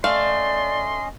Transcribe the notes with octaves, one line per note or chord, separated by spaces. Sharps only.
A3 C#4 D5 D#5 F5 C6